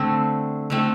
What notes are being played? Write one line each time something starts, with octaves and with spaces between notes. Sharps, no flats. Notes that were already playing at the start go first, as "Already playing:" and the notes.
Already playing: D3 A3 C4
D3 A3 C4